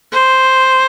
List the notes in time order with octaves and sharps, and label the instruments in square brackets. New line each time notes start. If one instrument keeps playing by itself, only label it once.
[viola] C5